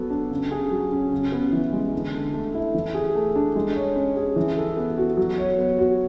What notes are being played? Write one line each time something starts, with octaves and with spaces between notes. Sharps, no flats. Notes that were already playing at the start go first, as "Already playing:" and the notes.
Already playing: F#3 B3 A4
D4
C#3
G#4
F#3
C#4
C#3
B3
E3
G#3
D3
D3
A3
E4
E3
G#4
A3
D4
G#3
C#5
C#4
G#4
E3
A4
B3
F#4
F#3
C#5
B3
F#4